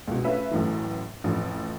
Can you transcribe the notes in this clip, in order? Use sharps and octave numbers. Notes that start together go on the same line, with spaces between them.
C#2 B2
A3 C#4 F4 B4 E5
A1 F#2 A2 E3
A1 F2